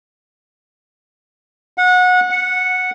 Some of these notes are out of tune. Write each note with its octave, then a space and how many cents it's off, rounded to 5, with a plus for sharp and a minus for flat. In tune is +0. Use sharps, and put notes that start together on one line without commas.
F#5 -25
F#5 -10